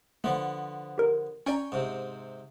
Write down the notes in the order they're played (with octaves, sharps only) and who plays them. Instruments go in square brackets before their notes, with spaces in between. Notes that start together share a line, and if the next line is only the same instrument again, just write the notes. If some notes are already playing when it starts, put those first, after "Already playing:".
[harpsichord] D3 F3 B3 [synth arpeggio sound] A3
[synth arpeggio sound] G4 A#4
[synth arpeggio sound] C#4 D5 A#5 [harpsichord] C#5 G5 G#5
[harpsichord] G#2 C3